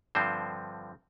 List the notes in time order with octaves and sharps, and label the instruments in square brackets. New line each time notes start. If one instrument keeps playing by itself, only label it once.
[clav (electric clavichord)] G2 D3 F3 C4 C5